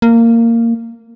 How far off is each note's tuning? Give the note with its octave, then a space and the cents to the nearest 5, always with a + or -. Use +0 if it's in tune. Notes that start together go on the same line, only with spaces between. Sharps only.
A#3 -15